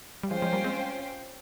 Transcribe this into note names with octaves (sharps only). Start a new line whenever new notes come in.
G3
F3 G#3 C#4 F4 C5 G5
F3 G#3
G3 A#3
G#3 C4